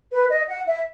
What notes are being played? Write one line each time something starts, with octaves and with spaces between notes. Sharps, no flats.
B4
D#5
F#5
E5